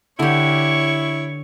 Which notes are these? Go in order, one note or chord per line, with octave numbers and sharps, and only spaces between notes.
D3 E4 G4 C#5 C#6